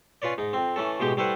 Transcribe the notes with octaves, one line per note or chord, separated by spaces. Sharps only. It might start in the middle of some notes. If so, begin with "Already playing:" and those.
C#4 F4 B4 C#5 D5
G#2 D#4
F2 C4
E3 A3 C#4 A4
A1 B2 G#3 G4 G5 D6
G3 A3 E4 B4 C5 F#5